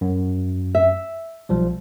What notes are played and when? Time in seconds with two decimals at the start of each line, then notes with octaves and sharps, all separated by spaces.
0.01 F#2
0.75 E5
1.49 B1 F3 G3